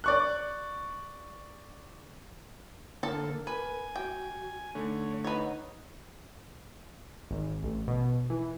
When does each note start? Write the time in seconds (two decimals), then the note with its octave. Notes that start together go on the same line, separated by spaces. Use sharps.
0.04 D5 C#6 F#6
3.03 D3 A#3 A4 A#4 A5
3.47 B4 G#5
3.96 F#4 G5
4.75 D3 A3 D#4 C#5
5.24 D#4 B4 C#5 F#5
7.30 G#1
7.63 A1
7.88 B2
8.30 E3